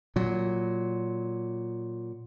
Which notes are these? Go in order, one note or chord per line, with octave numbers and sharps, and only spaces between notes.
A#2 F#3